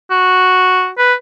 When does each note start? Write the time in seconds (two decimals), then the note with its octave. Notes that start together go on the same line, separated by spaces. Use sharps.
0.11 F#4
0.98 B4